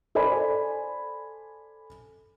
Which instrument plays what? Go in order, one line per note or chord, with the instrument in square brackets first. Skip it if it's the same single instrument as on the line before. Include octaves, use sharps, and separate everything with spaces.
[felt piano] A4 C5 D5 G#5 B5